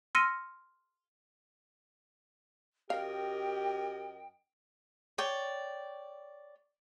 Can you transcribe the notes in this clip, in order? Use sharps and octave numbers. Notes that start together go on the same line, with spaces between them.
C6 E6 F6 A#6 C#7 D#7
F#2 G4 A#4 D#5 F5 G5
C#5 D5 G5